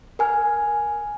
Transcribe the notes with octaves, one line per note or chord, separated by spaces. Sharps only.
A#4 G#5 F6